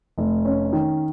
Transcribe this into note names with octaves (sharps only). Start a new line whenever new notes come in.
F1
C#4
D#3